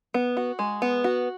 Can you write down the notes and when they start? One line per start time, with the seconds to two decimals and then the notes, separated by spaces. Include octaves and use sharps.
0.14 B3
0.37 F#4
0.59 G#3
0.82 B3
1.04 F#4